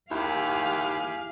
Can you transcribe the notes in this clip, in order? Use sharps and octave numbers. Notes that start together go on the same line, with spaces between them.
D#2 E4 G4 G#4 F5